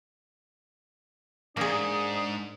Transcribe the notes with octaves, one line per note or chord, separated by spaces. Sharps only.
G#2 A#3 D4 G#4 D#6